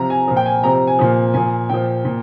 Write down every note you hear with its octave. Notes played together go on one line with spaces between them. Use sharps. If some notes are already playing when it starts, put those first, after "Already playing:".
Already playing: C3 F3 A#5
G#5
A#2 F3
G5
G#5
C3 F3 A#5
A#5
G#5
A#2 F3
A#2 F3 G#5
A#2 F3 G5
A#2